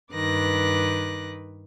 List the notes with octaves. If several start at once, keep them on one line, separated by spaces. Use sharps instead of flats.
G2 D#3 B4 D6 F#6 A#6